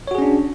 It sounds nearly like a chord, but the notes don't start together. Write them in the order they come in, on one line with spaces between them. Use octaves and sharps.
C#5 F#4 G#4 C#4 D4